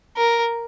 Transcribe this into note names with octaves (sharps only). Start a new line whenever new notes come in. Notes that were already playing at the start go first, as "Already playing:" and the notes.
A#4